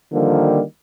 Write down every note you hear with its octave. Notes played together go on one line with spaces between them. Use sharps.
D3 D#3 F3 G3 A#3